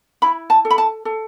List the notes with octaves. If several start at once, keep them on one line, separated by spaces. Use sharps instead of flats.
E4 B5
A5
A4
B5
A5
A4